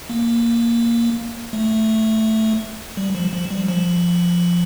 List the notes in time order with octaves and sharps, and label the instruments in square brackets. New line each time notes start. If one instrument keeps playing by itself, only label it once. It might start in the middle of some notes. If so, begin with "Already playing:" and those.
[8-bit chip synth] A#3
A3
G3
F3
F3
G3
F3